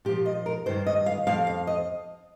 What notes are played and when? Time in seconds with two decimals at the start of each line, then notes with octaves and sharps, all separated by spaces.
0.05 A#2 G4
0.09 F3
0.26 D#5
0.46 A#4
0.66 G2 D#3 C5
0.86 D#5
1.06 F5
1.27 F2 F3 F5
1.47 F5
1.67 D#5